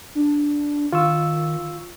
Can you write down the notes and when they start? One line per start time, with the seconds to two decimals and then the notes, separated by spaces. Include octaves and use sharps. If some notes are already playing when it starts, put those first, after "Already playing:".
0.15 D4
0.93 D#3 F4 C#6 E6